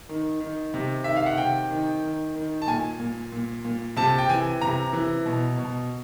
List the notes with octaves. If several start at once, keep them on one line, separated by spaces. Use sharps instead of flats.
D#3
D#3
C3
D#3 E5
F5
F#5
C3 G5
D#3
D#3
D#3
A5
A#2 G#5
A#2
A#2
A#2
C3 A5
G5
E3 G#5
C3 A#5
E3
B2
B2